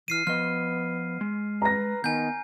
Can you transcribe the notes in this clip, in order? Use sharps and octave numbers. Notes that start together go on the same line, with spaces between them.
E3 F6 C7 D#7
F3 B3 D#5 F6
G#3
B4 A#5 A#6
D#3 B3 G#5 G6